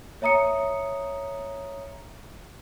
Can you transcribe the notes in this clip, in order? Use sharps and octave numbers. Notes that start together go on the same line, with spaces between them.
C#5 E5 A#5 D#6 C#7